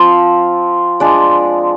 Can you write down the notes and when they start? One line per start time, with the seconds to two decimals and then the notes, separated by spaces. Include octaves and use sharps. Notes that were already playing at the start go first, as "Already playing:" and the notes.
Already playing: F3 C4 F4 C5
1.00 G#3 D4 F4 D5